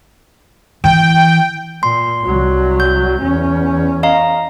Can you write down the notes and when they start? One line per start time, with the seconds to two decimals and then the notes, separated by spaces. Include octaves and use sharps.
0.84 E3 G5
1.83 A#2 C6
2.24 C2 F#3
2.80 G6
3.22 E2 C#4
4.03 D#5 F5 A#5